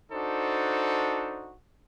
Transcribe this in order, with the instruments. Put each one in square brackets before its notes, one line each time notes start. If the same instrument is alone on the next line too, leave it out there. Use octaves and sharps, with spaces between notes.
[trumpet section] D4 D#4 F#4 A4 C5